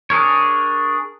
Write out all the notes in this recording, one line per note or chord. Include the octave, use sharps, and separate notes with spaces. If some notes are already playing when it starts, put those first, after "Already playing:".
D4 G#4 A#4 C#5